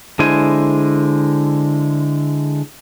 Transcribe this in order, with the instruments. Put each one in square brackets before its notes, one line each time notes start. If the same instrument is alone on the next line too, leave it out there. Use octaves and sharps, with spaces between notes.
[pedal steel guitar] D3 G#3 E4 C5 G#5